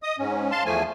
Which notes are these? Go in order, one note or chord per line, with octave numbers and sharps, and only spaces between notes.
D#5 D#6
G#2 C#4
F5 A5 C6
E2 F3 A3 G#5